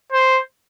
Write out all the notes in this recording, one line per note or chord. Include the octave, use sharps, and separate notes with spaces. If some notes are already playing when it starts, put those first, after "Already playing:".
C5